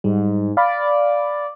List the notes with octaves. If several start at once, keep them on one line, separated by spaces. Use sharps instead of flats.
G#2 G3
D5 F5 B5